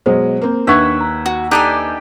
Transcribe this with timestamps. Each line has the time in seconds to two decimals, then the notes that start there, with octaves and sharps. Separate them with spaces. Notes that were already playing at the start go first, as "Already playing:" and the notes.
0.06 B2 F#3 G#3 C5
0.41 A#3 C4
0.67 D#2 D4 B4 E5 F#5 C#6 G#6 B6
1.01 A#5
1.26 F#4
1.51 D4 D#4 G4 A4 G5 G#5